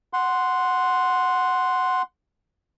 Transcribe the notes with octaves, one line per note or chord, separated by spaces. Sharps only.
F#5 C6